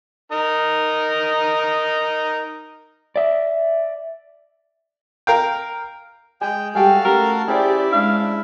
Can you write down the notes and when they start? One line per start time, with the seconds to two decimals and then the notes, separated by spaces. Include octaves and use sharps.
0.32 D#4 A#4 D#6
3.16 D5 E5
5.27 A#4 F5 G5
6.42 G#3 G5 G#5
6.75 G3 F#4 G4 A4 F5 G5 G#5
7.05 A3 C#4 G4 A#4 A#5
7.48 C#4 E4 G4 G#4 C5 D5 G5
7.93 G#3 D4 F5